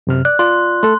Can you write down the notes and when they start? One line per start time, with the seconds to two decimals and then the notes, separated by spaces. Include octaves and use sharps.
0.07 F#2 C3 F6
0.25 D5 F#6
0.39 F4 D5 C6
0.83 A3 A4 A5 C6